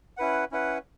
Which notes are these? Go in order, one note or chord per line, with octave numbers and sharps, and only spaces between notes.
C#4 E4 B4 F#5
C#4 E4 B4 F#5